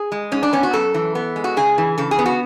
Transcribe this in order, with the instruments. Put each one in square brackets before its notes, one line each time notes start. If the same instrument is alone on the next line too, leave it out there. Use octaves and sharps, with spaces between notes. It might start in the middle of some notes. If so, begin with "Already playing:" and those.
Already playing: [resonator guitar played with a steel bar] G#4
G#3
G#2 C#4
D4
B3 C#4
F#4
F#2 A4
E3
B3
G#3
F#4
C#3 G#4
E3
C#3 A4
G#4
B3
F#4